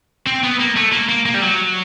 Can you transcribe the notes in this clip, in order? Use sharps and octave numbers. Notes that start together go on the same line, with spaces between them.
C4
B3
A#3
A3
A#3
A#3
A#3
G3
F#3